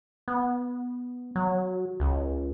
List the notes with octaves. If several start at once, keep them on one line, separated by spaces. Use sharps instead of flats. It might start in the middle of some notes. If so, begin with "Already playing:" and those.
B3
F#3
C#2